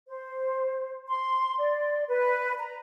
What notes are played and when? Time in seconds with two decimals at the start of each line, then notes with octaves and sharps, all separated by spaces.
0.08 C5
1.07 C6
1.58 D5
2.07 B4
2.58 A#5